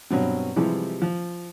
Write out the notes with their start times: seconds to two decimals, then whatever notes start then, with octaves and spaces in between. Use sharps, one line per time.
0.10 G2 B2 F#3 C4
0.56 C3 E3 F3 G3 G#3
1.02 F3